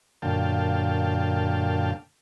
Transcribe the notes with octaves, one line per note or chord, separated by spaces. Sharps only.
F#2 A#2 D3 F5 G5 A5